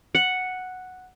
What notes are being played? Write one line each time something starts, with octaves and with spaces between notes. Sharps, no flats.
F#5